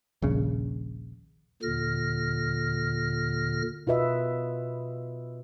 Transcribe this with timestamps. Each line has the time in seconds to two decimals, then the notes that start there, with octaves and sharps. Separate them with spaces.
0.22 D#1 A#1 C#3
1.63 D#2 A#2 D3 F6 A#6
3.87 B2 F4 F#4 B4 D#5 E5